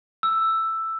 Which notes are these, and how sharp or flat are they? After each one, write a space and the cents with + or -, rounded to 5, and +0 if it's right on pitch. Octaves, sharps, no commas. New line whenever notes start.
E6 +5